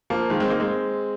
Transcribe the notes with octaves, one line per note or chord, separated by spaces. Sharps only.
F3 A#3
D#3 G#3
G#3 C4
A#3 D#4
G#3 C4